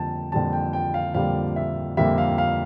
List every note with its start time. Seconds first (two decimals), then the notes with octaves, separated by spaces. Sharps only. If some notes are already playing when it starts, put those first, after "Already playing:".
Already playing: F2 D3 G3 A#3 G5 A5
0.32 F2 D3 G3 A#3 A5
0.53 G5
0.73 G5
0.94 F5
1.14 F2 D3 G3 A#3 F5
1.56 E5
1.97 F2 D3 G3 A#3 E5
2.18 F5
2.38 F5